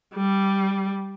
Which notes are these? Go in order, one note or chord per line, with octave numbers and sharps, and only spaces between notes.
G3